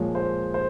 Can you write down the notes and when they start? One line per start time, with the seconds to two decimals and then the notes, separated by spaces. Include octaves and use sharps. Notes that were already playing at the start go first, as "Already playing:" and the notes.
Already playing: A#2 F3 G#3 C#5
0.15 C5
0.54 C5